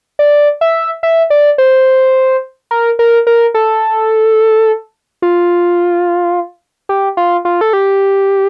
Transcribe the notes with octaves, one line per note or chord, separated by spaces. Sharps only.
D5
E5
E5
D5
C5
A#4
A#4
A#4
A4
F4
G4
F4
F4
A4
G4